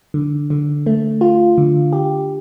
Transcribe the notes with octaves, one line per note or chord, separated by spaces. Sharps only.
D3
D3
A3
F4
D3
G4